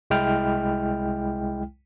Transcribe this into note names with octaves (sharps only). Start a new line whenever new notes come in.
C2 G#3 E4 G5 F6